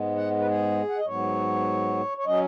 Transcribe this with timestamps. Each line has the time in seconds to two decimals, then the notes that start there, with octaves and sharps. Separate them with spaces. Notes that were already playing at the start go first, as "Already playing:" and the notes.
Already playing: G#2 G#3 B3
0.16 F#5
0.39 B4
0.47 G#4
0.89 F#5
0.97 D#5
1.06 G#2 F#3 B3 C#5
2.18 C#5
2.26 F#3 C#4 D#5